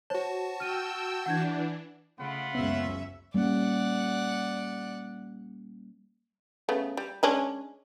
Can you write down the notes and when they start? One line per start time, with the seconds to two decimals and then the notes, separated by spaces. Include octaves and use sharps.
0.10 F#4 C5 C#5 A5
0.60 G5 E6 F6 D#7
1.26 E3 D4 F#5 G6 G#6
2.19 C#3 A3 F4 F#5 B5
2.55 F#1 C#2 B3 C#4 E5
3.34 G3 A#3 C#4 D5 F#5
6.69 C#3 A3 B3
6.97 G3
7.23 G#3 C#4 D4